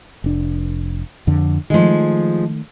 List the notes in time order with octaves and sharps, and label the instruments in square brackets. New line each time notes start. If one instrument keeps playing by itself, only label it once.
[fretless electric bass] F1 D4
F2 D3
[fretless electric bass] D#3 A3 [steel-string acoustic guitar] F3 G#3